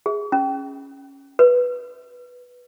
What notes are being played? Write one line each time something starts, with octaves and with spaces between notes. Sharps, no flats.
G#4
C#4
B4